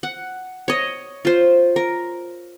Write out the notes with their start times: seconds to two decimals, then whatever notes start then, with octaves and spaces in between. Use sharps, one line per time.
0.03 F#5
0.68 C#5 D#5
1.25 F4 C5
1.76 A#4